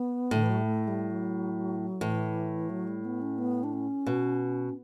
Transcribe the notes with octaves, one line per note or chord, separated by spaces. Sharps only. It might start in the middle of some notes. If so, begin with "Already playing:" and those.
Already playing: B3
A2 D3
E3
F#3
G3
A3
G3
F#3
A2 E3
F#3
G3
B3
C#4
B3
D4
C#4
B2